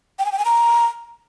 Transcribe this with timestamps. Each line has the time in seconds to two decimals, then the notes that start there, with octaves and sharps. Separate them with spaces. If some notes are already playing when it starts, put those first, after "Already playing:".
0.19 G5
0.25 G#5
0.32 G5
0.39 G#5
0.45 A#5